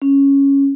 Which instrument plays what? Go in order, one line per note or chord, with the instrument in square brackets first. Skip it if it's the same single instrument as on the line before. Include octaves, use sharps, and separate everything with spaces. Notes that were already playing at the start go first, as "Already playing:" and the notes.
[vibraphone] C#4